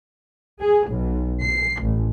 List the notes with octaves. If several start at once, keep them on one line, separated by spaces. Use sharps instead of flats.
G#4
B1
C7
A1